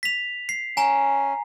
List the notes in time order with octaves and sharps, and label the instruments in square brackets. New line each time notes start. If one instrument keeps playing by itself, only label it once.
[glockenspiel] B6 F7
C7
[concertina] C#4 [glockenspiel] G#5 A#5